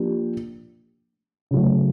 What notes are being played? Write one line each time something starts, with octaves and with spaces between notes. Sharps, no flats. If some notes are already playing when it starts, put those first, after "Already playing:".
Already playing: F3 A#3 D4 G4
C#3 F#3 A3